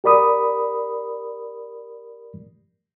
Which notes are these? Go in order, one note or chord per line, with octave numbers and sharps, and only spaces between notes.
G4 A#4 D5 B5 D#6